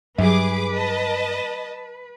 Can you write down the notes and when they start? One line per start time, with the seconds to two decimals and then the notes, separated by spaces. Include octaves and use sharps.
0.18 G2 F#3 G#4 B4 D6
0.74 D#5 A5